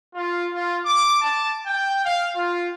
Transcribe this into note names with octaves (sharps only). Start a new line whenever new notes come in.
F4
F4
D6
A5
G5
F5
F4